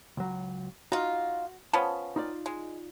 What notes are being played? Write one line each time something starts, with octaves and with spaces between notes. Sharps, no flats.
C#2 F#3
D#4 F4 F#4
F3 B3 C#4 F#5 A5
D#4 F4 D5
G#3